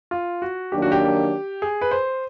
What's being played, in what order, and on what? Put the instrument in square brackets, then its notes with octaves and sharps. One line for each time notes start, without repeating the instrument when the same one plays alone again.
[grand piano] F4
F#4
[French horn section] D#3 F#3 A#3 D4 [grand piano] G4
[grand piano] F#4
G4
G#4
B4
C5